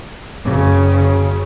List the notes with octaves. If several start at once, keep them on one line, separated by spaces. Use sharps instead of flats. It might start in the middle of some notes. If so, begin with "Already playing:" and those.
F#1 C#3 C#4